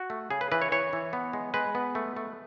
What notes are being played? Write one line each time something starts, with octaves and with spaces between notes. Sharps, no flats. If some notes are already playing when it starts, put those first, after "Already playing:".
Already playing: F#4
A3
C#3 G#4
B4
E3 B4
C#5
E3 C#5
E3
B3
G#3
G#3 B4
B3
A3
A3